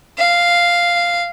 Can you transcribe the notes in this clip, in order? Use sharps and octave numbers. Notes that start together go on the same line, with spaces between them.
F5